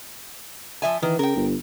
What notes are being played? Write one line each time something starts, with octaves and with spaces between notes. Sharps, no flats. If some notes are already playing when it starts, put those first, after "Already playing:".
F3 E5 G#5
D#3 E3
C#3 A#4 G5
G1